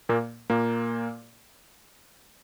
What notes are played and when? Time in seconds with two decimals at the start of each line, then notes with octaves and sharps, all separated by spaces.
0.09 A#2 A#3
0.50 A#2 A#3